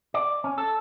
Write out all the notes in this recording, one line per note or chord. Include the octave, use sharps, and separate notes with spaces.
D5
C#4
A4